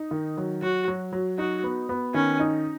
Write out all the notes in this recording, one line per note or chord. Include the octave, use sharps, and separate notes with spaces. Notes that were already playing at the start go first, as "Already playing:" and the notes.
Already playing: D#4
D#3
F#3
F#3 F#4
F#3
F#3
D#4 F#4
B3
B3
D#3 C#4
D#4